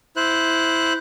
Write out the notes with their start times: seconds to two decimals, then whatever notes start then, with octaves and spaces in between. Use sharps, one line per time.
0.16 E4 C5 F#6